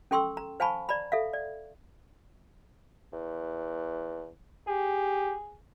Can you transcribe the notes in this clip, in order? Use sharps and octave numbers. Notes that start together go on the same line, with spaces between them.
C#4 A4 G5 C6 C#6 E6
A#5
C5 F5 G#5 A5 B5 C#6
D5 A#5 B5
A4 E5 F5
D5
E2
G4 G#4